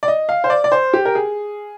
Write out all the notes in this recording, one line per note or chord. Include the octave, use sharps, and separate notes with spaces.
D5
D#5
F5
C5
D5
D5
C5
G4
A#4
G#4